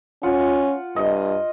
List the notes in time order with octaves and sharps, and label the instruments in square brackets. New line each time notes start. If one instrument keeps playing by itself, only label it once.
[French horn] C#4 [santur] F4 F#5
[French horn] G2 [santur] D#5